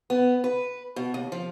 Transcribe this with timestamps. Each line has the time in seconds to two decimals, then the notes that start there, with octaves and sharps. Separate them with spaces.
0.10 B3
0.44 B4
0.96 B2
1.14 D#2
1.32 F3